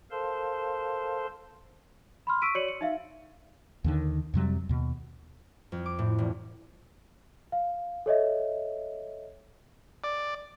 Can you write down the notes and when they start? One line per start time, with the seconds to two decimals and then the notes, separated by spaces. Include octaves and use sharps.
0.11 A4 A#4 C5 F5 A5 C6
2.27 B5 C6 F6
2.42 C#6 E6 B6 D7 D#7
2.55 F#4 C#5 D5 C#7 D#7 F#7
2.68 C#7
2.81 D#4 E5 F5
3.84 D#2 D3 D#3
4.34 F2 C3 F#3 G3
4.69 D#2 B2
5.72 F2
5.86 D6
5.99 A2
6.18 E1
7.52 F5
8.06 A4 C#5 D#5 E5
10.04 D5